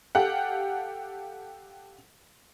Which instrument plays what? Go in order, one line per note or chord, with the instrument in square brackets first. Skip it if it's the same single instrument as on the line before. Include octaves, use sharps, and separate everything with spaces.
[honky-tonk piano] G4 A4 F5 F#5